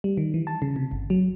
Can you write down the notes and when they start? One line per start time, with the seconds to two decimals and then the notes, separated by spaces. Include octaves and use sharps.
0.04 G3
0.17 D#3
0.34 E3
0.47 A5
0.62 C#3
0.76 C3
0.91 G1
1.10 F#3